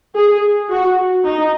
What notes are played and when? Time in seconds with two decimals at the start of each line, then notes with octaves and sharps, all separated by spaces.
0.16 G#4
0.71 F#4
1.25 D#4